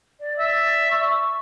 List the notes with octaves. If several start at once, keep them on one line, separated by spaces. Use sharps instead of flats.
D5
E5
C#6